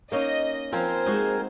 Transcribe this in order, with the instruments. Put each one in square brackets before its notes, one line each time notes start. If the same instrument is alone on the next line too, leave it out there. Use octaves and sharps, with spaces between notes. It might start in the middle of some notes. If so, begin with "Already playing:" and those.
[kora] A#3 C#4 D#4 [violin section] D#5
[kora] F3 C4 [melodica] A#4 G#5 [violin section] C5
[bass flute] G#3 [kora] D#4 F#4